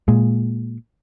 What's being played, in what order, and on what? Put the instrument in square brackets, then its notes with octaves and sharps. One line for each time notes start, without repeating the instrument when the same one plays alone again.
[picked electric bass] A#2 G#3